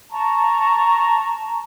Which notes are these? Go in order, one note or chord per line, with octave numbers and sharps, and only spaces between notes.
A5 A#5 C#6